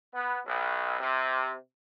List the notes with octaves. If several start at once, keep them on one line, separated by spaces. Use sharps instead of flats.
B3
B1
C3